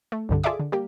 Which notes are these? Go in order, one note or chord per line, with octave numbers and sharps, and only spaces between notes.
A3
C2 G2 D3
F4 G#4 A4 D5 E5 D6
D3
G3 A#3 G4